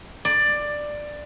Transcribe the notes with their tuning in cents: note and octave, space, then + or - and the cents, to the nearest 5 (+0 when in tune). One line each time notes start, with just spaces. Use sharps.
D5 +10